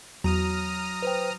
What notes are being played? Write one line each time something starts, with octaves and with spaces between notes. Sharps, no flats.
E2 F#3 A#5 D#6 F6
B4 C5 G5